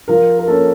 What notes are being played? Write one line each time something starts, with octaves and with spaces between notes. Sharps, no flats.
F3 A#4
A#4
A#3 C#4 A4